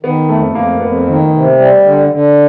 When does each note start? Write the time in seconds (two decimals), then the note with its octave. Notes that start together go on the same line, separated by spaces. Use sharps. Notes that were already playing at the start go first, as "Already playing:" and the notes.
0.03 D#3 B3
0.29 F2 A3
0.54 F2 A#3
0.80 F2 B3
1.06 D#3
1.32 C3
1.57 G3
1.83 D3
2.09 D3